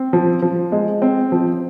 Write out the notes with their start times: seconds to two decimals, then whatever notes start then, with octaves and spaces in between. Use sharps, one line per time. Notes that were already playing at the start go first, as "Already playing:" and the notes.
Already playing: C4
0.13 F3
0.42 F3
0.72 G#3
1.02 C4
1.32 F3